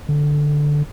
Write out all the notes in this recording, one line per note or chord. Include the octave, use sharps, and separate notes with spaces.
D3